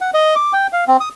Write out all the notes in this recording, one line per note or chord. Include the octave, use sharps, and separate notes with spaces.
F#5
D#5
D6
G5
F5
C4
D#6